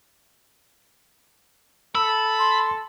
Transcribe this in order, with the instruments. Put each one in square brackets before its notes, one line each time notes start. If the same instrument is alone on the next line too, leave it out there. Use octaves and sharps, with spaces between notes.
[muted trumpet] A4 [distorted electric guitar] B5 [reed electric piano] E6
[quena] C6